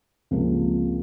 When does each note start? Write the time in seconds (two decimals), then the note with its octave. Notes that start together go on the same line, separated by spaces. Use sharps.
0.31 C#2 C3 F3 A#3